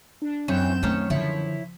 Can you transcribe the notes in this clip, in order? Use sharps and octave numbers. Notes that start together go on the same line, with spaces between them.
D4
F#2 E3 C4 C#5 G6 E7
D#3 A3 C#4 D#4 C#5
D3 D#3 F3 E4 C#5